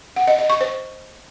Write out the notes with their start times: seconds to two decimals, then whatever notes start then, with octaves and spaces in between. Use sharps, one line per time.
0.16 F#5
0.27 D#5
0.39 D#5
0.50 C#6
0.61 C5